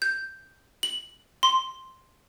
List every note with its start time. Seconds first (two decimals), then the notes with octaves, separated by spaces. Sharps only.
0.02 G6
0.83 F#7
1.43 C6